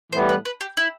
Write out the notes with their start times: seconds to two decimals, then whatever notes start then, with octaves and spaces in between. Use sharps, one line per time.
0.12 A2 E3 G3 B3 C5
0.29 B4
0.45 B4
0.61 G4
0.77 E4